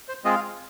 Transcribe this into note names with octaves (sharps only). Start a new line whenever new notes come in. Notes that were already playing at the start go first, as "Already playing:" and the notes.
C5
G#3 C4 F4 G#4 D#5
F5